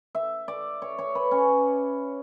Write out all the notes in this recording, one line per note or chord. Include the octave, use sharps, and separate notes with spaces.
E5
D5
C#5
C#5
B4
C#4